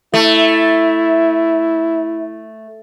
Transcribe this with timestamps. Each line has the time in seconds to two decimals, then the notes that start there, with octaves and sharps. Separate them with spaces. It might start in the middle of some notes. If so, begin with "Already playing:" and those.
0.14 A3 E4